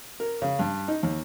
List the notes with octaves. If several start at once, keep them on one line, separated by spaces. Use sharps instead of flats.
A#4
C#3
G2
D#4
D#2